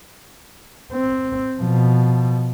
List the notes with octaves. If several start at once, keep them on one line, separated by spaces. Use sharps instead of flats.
C4
B2 F3